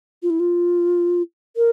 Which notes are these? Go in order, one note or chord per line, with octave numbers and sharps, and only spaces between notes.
F4
E4
F4
A#4